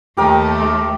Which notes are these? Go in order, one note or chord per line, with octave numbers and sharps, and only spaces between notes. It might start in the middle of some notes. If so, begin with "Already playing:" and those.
D#2 A3 G4 A#4 D#5